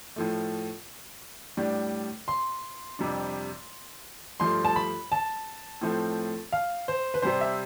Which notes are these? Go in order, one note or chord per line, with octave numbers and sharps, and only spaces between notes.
A2 F3 A3
A2 G3 D4
C6
F2 C3 G3 D4
G2 F3 A3 C6
A5
B5
A5
A2 F3 A3 C4
F5
C5
B4
C3 G3 C4 C5
E5